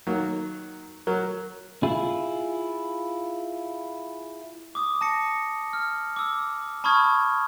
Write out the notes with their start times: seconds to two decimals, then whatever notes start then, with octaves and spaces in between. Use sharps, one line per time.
0.07 D#3 F#3 A#3
1.07 F#3 A#4
1.83 E4 F4 G#4
4.75 D6 D#6
5.01 A5 A#6 C#7
5.73 F6
6.16 D6 E6
6.84 A5 B5 C#6 D#6 F6 G#6